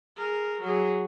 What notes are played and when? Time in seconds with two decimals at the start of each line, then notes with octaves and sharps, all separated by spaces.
0.16 G#4 A#4
0.60 F#3 G#4